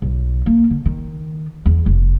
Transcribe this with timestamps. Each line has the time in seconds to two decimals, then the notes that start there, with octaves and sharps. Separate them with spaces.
0.02 B1
0.46 A#3
0.70 D3
0.85 D#3
1.66 E2
1.86 F1